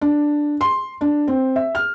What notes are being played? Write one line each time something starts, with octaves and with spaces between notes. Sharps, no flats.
D4
C6
D4
C4
E5
F6